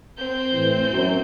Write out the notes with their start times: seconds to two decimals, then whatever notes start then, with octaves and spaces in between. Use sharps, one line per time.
0.16 C4 G6
0.52 A2 E3
0.92 F#2